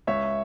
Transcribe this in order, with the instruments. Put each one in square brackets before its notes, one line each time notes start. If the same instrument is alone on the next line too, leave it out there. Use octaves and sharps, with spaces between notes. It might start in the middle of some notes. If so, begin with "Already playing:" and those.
[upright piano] C#2 C#5 E5